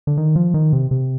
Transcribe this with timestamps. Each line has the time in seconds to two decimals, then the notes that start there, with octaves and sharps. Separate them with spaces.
0.07 D3
0.17 D#3
0.36 F3
0.54 D#3
0.73 C3
0.91 C3